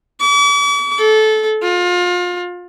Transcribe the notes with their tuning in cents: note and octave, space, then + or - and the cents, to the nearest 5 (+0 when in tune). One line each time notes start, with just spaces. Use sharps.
D6 -45
A4 -20
F4 +30